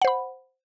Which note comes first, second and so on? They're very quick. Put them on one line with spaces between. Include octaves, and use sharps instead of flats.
F#5 C5 B5